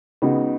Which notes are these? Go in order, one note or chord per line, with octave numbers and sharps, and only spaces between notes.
C#2 C#3 B3 D#4 F#4